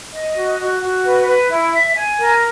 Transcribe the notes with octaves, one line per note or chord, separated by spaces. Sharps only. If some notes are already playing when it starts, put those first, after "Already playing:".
D#5
F#4
F#4
F#4
B4
B4
E4
E5
G#5
A#4